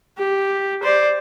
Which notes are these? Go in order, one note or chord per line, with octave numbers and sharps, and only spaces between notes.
G4
C5 D5